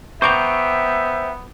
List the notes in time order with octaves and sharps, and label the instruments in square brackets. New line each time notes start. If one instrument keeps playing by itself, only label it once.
[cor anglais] B3 [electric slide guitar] C5 G5 A#5 [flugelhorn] E5 [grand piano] C#6 D6 G6